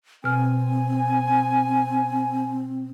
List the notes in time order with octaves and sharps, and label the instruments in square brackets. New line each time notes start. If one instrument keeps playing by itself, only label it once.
[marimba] B2 F6 [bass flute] C4 [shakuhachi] G#5